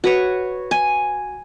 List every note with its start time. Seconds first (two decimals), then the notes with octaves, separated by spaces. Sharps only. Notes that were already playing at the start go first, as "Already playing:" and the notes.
0.04 F#4 B4 C#5
0.71 G#5